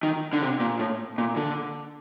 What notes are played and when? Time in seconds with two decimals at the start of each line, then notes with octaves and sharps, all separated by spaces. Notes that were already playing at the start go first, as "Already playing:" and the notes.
0.03 D#3
0.33 D3
0.42 C3
0.60 A#2
0.80 A2
1.18 A#2
1.37 D3